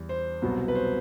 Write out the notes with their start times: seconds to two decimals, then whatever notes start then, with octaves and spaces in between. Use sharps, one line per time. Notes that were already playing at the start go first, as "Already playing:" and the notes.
Already playing: E2 G3
0.09 C5
0.42 C2 B2 F#3 B3
0.68 B4
0.75 C5